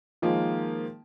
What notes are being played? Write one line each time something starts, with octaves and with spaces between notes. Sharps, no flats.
D#3 F3 G#3 A#3